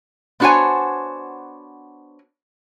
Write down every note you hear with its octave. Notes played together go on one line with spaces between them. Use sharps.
B3 D4 F#4 C5 C#5 G#5